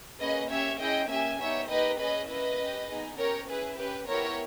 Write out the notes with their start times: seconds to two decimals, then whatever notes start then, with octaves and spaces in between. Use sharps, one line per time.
0.21 A#3 C#4 G#4 B4 D#5
0.50 C#4 G4 C#5 E5
0.80 C#4 E4 G#4 D#5 G5
1.10 A#3 C#4 G4 E5 G#5
1.40 B3 D#4 G4 C#5 E5
1.69 A#3 D#4 G4 B4 D#5
1.99 C#4 G#4 B4 D#5
2.29 A#3 C#4 E4 B4 D#5
2.59 C#4 G4
2.89 B3 D#4 G#4
3.18 C#4 G4 A#4 C#5
3.48 C#4 E4 G#4 B4
3.78 C#4 G4 B4
4.08 B3 E4 G4 A#4 C#5